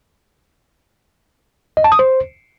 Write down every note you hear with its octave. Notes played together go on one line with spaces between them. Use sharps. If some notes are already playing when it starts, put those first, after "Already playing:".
D#5
A5
D#6
C5